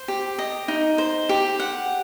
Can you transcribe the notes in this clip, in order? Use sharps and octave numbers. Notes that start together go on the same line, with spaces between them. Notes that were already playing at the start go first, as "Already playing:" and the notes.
Already playing: C5
G4
D#5
D#4
C5
G4
F#5